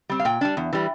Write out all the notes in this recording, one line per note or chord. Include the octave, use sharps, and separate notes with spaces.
G3 C4
F5
A#2 G5
G3 D4
E2
E3 G3